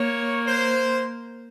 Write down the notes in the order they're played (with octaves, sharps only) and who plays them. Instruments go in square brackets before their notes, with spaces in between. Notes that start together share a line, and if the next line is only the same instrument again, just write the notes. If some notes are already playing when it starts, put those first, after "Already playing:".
Already playing: [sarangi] A#3 [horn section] C#5
[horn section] C5